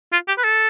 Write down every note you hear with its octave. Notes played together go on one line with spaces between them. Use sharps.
F4
G4
B4
A4